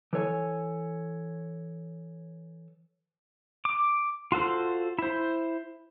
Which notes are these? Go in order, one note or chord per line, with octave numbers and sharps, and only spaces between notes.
E3 A4 C#5 G#5
D6
F4 F#4 A4 C5
E4 C5